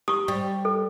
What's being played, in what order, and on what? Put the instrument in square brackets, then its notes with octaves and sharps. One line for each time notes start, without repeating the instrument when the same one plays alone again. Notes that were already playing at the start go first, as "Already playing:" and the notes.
[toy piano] G4 C#6 [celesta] D#6
[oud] G3
[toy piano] A4